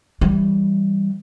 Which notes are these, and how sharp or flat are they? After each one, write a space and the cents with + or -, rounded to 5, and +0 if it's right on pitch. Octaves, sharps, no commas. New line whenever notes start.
E3 +0 G3 +0